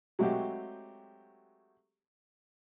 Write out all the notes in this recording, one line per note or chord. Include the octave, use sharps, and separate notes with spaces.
F#3 G#3 A3 C4 F#4 G4